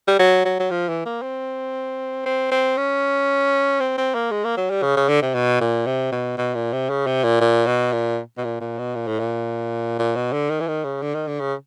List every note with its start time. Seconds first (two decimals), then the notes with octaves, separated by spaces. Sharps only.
0.08 G3
0.19 F#3
0.45 F#3
0.59 F#3
0.71 F3
0.89 E3
1.06 A#3
1.22 C4
2.26 C4
2.51 C4
2.77 C#4
3.80 C4
3.98 C4
4.15 A#3
4.31 G#3
4.44 A#3
4.57 F#3
4.70 G3
4.83 C#3
4.97 C#3
5.09 D3
5.22 C3
5.34 B2
5.61 A#2
5.86 C3
6.12 B2
6.38 B2
6.55 A#2
6.73 C3
6.90 C#3
7.06 C3
7.23 A#2
7.41 A#2
7.66 B2
7.92 A#2
8.37 B2
8.44 A#2
8.61 A#2
8.79 B2
8.95 A#2
9.07 A2
9.19 A#2
9.99 A#2
10.16 B2
10.33 D3
10.50 D#3
10.60 E3
10.68 D#3
10.84 C#3
11.02 D3
11.15 D#3
11.27 D3
11.40 C#3